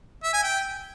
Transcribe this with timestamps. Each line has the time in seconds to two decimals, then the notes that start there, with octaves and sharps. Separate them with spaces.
0.23 E5
0.33 G#5
0.44 G5